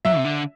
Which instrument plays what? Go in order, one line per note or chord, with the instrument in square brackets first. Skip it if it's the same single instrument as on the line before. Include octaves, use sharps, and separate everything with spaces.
[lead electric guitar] F#3 [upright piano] E5
[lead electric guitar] C3
D3